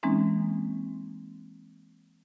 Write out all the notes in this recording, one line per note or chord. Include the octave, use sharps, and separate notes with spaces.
E3 G#3 A#3 C4 C#4 D#4